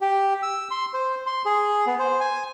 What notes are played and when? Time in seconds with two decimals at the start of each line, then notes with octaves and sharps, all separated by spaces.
0.01 G4
0.43 E6
0.71 C6
0.94 C5
1.26 C6
1.45 G#4
1.87 B3
1.99 C5
2.20 G#5